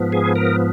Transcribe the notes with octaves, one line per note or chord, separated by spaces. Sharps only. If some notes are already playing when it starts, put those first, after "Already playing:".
Already playing: G#2 F3 B3
G#4
A#4